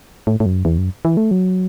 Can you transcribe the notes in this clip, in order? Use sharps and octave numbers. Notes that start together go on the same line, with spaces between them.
A2
A2
F#2
E2
F#2
E3
A3
F#3